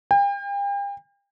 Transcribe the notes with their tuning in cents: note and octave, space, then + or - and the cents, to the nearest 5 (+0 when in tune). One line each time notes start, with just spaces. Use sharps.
G5 +40